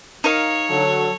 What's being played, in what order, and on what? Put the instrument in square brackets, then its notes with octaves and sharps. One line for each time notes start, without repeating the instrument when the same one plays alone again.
[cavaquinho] D#4 A#4 F5 [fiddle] C#5
[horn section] D3 F#3 [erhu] A4